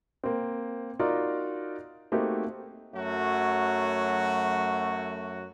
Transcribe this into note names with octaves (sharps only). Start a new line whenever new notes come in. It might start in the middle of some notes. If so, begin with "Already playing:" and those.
A#3 C4
D#4 F4 F#4 A#4 D5
A3 A#3 C4 D#4 F#4 G4
F#2 F#3 A3 F#4